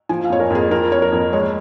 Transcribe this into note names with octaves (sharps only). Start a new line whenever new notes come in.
F3 G#5
F5
F2 C#5
A#4
F2 G#4
F3 A#4
F2 C#5
A#4
F2
G#3 C#5